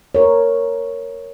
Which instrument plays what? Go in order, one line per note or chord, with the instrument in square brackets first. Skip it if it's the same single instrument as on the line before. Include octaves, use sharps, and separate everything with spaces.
[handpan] A#4 C#5